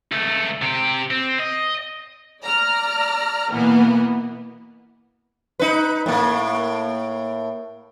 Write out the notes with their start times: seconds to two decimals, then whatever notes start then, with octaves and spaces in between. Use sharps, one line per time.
0.12 C#2 A3
0.62 C3 G4
1.11 C4
1.40 D#5
2.43 D5 A#5 F6
3.52 B2 E3 A#3 B3
5.59 D#4 B4
6.06 A2 A#3